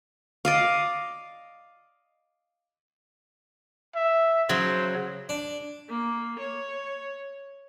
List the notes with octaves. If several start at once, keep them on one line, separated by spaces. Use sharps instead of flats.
D5 D#5 F5
E5
C#3 F#3 C5
D4
A#3
C#5